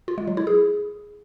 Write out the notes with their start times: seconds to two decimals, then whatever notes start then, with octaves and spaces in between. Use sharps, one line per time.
0.08 F4
0.18 G#3
0.27 F#3
0.37 E4
0.47 G#4